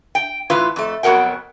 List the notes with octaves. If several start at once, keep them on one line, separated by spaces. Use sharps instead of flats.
G5
A2 E3 F4 B4 F5
F2 A3
F2 B2 F#3 A#4 F#5 G5